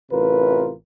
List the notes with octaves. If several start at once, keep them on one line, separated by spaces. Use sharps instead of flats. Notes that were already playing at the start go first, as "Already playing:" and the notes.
A1 C3 F4 A#4 B4